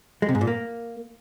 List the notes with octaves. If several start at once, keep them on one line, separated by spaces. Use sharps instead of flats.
G#3
C3
G#2
A#2
A#3